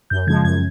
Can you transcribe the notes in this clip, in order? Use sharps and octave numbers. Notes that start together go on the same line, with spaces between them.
F#2 G6
C#3 F3 G#3 G#6
F#2 G#6